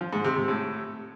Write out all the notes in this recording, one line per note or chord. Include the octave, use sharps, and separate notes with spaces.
F3
G#2
C3
C3
A2